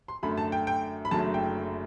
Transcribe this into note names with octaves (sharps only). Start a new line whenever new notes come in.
C6
F#2 D3 A3 B5
A5
G5
G5
B5
F#1 F#2 D3 F#3 A3 A5
G5